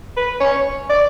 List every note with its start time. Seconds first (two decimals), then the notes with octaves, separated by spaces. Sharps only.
0.17 B4
0.41 C#5
0.90 D5